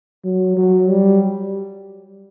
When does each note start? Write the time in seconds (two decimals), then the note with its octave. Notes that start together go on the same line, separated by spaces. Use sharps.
0.25 F#3
0.57 F#3
0.88 G3